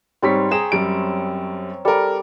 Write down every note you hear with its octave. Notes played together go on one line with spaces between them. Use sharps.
G#2 G3 C4 C#5 B6
G#4 G5 A#5 D#6 E7
F#2 G3 D7
G3 A4 A#4